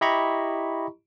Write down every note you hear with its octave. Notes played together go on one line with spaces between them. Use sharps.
E4 G4 D#5 A#5 B5 C#6